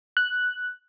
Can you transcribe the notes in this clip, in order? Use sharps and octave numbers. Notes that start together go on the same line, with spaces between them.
F#6